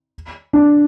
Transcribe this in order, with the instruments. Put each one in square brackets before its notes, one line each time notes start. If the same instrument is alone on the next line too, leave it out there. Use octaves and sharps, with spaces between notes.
[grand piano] D4